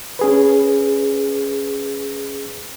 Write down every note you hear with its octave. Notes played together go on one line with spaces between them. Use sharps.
C#4 G#4 B4